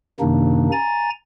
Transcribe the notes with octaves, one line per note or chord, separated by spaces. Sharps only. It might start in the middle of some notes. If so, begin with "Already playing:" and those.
F#2 C3 D#3 A#3 D4 D#4
G#5 A#5 A6